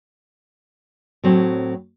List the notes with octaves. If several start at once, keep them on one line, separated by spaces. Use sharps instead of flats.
A2 F#3 C4